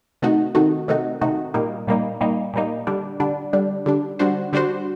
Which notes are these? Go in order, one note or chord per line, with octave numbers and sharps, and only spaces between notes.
C3 D#3 A3 D#4 F#4
C3 D#3 A3 D#4 F#4
C3 D#3 A3 D#4 F#4
C3 D#3 A3 D#4 F#4
A#2 G3 A#3 D#4
A#2 G3 A#3 D#4
A#2 G3 A#3 D#4
A#2 G3 A#3 D#4
D3 G3 D4
D3 G3 D4
D3 G3 D4
D3 G3 D4
D3 G3 D4 F#4 C5
D3 G3 D4 F#4 C5